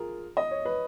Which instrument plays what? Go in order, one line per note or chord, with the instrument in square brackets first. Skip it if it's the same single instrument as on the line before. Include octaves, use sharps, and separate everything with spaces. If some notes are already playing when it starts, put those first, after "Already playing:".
Already playing: [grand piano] F4 G#4 A#4
D#5
C#5
B4